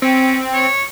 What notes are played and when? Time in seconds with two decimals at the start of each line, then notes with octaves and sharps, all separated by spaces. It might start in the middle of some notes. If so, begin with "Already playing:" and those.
0.02 C4 C#4
0.54 C#5